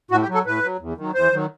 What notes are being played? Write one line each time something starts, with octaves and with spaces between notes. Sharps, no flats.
A2 F#4
G4
F#3
A4
A2 B4
F#3
E2
D#3 F#3
E2 C5
D#3 F#3